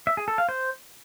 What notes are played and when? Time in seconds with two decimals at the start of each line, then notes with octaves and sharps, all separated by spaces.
0.07 E5
0.17 G#4
0.28 A4
0.38 F5
0.49 C5